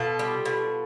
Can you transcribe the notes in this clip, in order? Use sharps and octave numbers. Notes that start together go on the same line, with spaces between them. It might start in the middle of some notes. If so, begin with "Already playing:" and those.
Already playing: B2 F4 A4
G3
B2